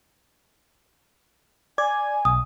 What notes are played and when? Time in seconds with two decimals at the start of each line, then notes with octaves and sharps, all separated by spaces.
1.78 D5 G#5 G#6
2.25 B1 D#6